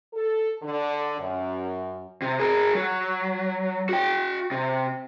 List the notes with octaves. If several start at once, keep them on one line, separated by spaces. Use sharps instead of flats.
A4
D3
F#2
C3
G#4 A#4
F#3
F#4 G5
C3